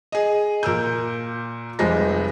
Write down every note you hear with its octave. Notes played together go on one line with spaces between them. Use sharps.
G#4 D#5
A#2 A#4 E6 G6
F1 F3 G3 G#3 C5 A#6